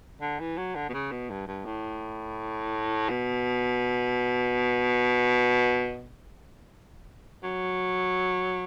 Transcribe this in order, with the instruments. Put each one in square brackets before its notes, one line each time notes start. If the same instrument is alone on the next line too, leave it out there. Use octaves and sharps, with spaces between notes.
[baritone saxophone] D3
E3
F#3
D3
B2
C#3
B2
G2
G2
A2
B2
F#3